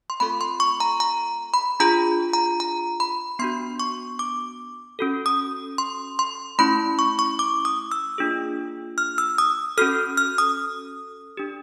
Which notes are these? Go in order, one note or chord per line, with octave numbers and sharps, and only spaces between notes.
C6
A3 C4 F4 A4 B5
C6
C#6
A#5
A#5
B5
D4 F4 G#4 A#5
A#5
A#5
B5
B3 D4 F#4 C6
C#6
D6
C#4 F#4 A4
D#6
C6
C6
A3 C#4 E4 B5
C#6
C#6
D6
D#6
E6
A#3 D4 F4 G#4
F6
E6
D#6
C#4 F#4 A4 F6
F6
D#6
D4 G4